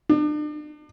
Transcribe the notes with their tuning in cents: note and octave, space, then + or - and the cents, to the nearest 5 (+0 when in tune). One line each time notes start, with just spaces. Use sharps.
D4 +40